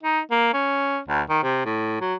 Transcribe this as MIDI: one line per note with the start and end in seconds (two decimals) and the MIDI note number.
0.03 0.20 63
0.31 0.48 58
0.54 0.99 61
1.08 1.22 38
1.30 1.39 51
1.43 1.63 48
1.65 1.98 45
2.01 2.15 54